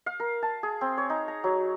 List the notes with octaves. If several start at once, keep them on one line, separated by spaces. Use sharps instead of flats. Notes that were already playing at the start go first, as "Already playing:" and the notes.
F5
A#4
A5
G#4
C4
C#5
D#4
A#5
F#3